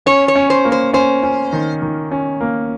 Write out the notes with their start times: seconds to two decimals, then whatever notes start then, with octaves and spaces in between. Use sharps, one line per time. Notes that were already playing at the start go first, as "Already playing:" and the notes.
0.06 C#4 C#5
0.28 C#5
0.35 C#4
0.50 C5
0.65 A#3
0.72 C5
0.93 C#4 C5
1.23 C#4
1.53 D#3
1.82 D#3
2.11 C#4
2.41 A#3